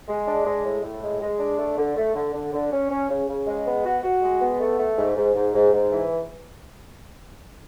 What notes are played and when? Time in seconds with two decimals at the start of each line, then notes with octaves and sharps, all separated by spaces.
0.08 G#3
0.27 D4
0.46 G#3
0.64 A2
0.83 A2
1.03 G#3
1.21 G#3
1.40 D4
1.58 A3
1.78 D3
1.96 A3
2.15 D3
2.34 D3
2.53 D3
2.71 C#4
2.90 C#4
3.09 C#3
3.28 C#3
3.47 G#3
3.65 B3
3.84 F#4
4.03 F#4
4.22 G#3
4.41 B3
4.60 A3
4.78 A3
4.97 G#2
5.16 G#2
5.35 G#2
5.54 G#2
5.73 G#2
5.91 E3